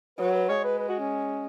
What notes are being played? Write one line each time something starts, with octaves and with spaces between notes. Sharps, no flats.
F#3 B4
B4
G#3 C#5
B4
B4
F#4
C#4